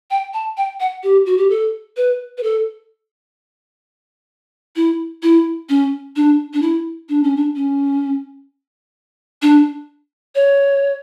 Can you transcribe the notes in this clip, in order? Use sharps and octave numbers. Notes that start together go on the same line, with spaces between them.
G5
A5
G5
F#5
G4
F#4
G4
A4
B4
B4
A4
E4
E4
C#4
D4
D4
E4
D4
C#4
D4
C#4
D4
C#5